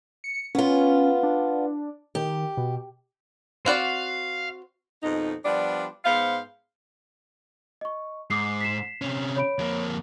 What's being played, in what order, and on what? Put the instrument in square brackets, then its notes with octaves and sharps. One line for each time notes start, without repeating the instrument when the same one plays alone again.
[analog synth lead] C#7
[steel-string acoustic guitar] B3 F4 [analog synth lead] C#4
[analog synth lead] D4
[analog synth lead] D#3 [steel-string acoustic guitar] G4
[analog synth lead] B2
[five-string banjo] C4 F#4 D5 [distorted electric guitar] F5
[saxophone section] F2 B2 D#3 D#4
F3 G3 B3 D4 F4 D5
G#2 B3 C5 F5
[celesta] D#5 C#6
[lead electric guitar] G#2 [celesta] D6 D#6 C7
[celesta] B6 C7 E7
[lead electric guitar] C3 C#4
[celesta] C#5 B5 D7
[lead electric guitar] F2 A#3